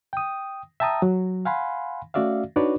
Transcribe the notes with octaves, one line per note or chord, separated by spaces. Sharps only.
G5 D#6
E5 G5 A5 A#5 D#6
F#3
F5 F#5 G#5 B5 C6
A3 C#4 F#4 D5 E5 F5
D4 D#4 F#4 B4 C#5 D5